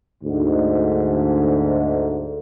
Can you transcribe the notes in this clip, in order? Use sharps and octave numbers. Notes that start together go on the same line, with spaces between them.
D2 G#2 D3